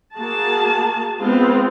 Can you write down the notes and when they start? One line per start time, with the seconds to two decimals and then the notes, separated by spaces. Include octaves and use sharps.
0.15 A#3 F#4 G#4 A5
1.20 G#3 B3 C4 F4